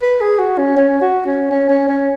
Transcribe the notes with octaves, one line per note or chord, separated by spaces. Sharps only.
B4
G#4
F#4
C#4
C#4
F#4
C#4
C#4
C#4
C#4